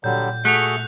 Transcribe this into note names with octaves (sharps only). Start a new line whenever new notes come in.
A#2 D3 F#3 G3 G6
A3 F#4 G#4 A4 F#6 F7